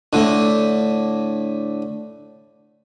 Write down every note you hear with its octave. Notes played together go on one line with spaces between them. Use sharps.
A2 D3